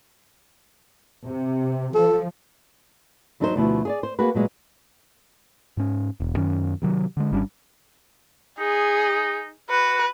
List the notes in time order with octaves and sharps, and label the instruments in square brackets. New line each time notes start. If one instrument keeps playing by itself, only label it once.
[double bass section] C3
[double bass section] F3 [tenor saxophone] A4
[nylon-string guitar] E2 F#3 D4 D#4 A4 C5
D2 B2 F3 E4
G#4 C#5 D5
C5
A#3 F#4 G#4 B4
A#2 F#3 G#3 B3
[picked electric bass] G#2 C#4
E1
F#2 D#3 C#4
C3 D#3 F#3
D3 G#3
G#1 G3 C#4 D4
[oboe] D#4 [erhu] G#4
[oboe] F#4 [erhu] B4